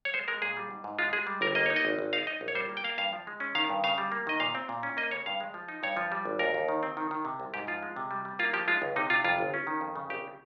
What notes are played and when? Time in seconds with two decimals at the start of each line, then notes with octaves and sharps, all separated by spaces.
0.05 C#5
0.14 G#3 C5
0.28 G#3 A#4
0.42 A#2 G#4
0.57 G3
0.71 G#2
0.84 G#2
0.99 G#3 F4
1.13 G#3 G#4
1.27 G3
1.41 G1 A#4
1.55 A#3 D#5
1.66 D#4 C#5
1.76 D#5
1.85 G#1
1.99 G#1
2.13 D#4 F5
2.27 D#4 D#5
2.41 A#1
2.48 C#5
2.55 G3 C5
2.69 A#3
2.77 G5
2.84 A#3 F5
2.98 G2 F5
3.13 F3
3.27 G#3
3.40 C#4
3.55 D#3 F5
3.70 G2
3.84 C#3 F5
3.98 G3
4.12 A#3
4.27 D#3 D#5
4.40 A#2 F5
4.55 C4
4.69 A#2
4.83 C#4
4.97 A#3 D#5
5.11 C#3 C#5
5.26 G2 F5
5.40 G#3
5.54 F3
5.68 D#4
5.83 G2 C#5
5.97 F3
6.12 G3
6.25 G#1
6.39 D#2 A#4
6.54 D#2
6.68 D#3
6.83 C4
6.97 D#3
7.11 D#3
7.25 C3
7.40 C2
7.54 G#2 G4
7.67 F3 F4
7.83 G#3
7.96 C3
8.11 G3
8.25 G3
8.39 A#3 F4
8.53 F3 G4
8.68 G#3 F4
8.82 C#2
8.96 C3 D#4
9.10 C3 F4
9.24 F2 F4
9.38 G1
9.54 C#4
9.67 D#3
9.81 F2
9.95 C#3
10.10 A#1 G4